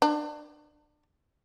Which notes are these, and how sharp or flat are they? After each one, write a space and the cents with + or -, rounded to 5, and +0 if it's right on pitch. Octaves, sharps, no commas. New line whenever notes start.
D4 +25